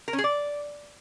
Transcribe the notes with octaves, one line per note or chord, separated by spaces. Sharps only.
A#4
C#4
G#4
D5